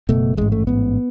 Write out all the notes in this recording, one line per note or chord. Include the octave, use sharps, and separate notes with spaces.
F#1 E2 B2 A3
A1 G#2 G#3
A3
A1 G#2 B3